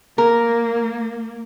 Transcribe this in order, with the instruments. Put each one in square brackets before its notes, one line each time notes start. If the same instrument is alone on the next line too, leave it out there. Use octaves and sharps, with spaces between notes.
[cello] A#3 [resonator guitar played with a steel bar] A#4